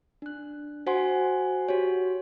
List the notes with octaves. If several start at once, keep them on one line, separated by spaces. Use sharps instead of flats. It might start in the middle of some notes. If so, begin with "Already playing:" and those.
D4 F#6
F#4 C5 F#5 G#5 C6
F#4 G4 C#5